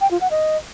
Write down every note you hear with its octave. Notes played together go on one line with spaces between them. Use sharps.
G5
F4
F#5
D#5